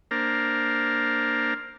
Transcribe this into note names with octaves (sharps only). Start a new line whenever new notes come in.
A#3 D4 A#4 C5